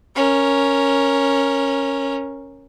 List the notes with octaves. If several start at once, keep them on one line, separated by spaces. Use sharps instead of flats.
C#4 A#4